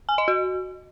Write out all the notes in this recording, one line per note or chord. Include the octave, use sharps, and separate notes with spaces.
G#5
D#5
F#4